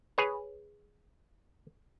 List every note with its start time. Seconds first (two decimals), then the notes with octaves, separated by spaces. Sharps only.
0.18 G#4 B4 C#5